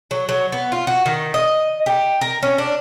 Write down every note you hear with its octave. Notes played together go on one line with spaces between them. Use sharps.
F#3
F#3
B3
F4
F#4
D#3
D#5
G4
A#4
C#4
D4